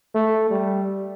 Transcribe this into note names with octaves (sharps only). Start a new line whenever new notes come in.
A3
G3